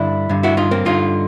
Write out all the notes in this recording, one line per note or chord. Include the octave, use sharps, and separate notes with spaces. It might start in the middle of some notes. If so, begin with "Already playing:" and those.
Already playing: G2 D3 D4 E4
G2 D3
E4 F#4
D#4 F4
A#3 C4
G2 D3 D#4 F4